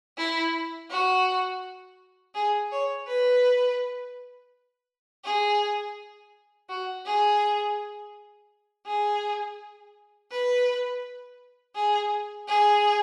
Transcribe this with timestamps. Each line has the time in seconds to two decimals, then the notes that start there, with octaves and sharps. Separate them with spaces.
0.17 E4
0.90 F#4
2.35 G#4
2.72 C#5
3.08 B4
5.24 G#4
6.69 F#4
7.05 G#4
8.86 G#4
10.31 B4
11.75 G#4
12.48 G#4